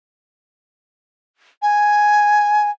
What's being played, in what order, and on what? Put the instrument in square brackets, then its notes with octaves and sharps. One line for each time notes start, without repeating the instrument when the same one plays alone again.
[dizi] G#5